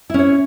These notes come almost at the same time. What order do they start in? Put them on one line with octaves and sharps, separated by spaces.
E4 C#4 C#5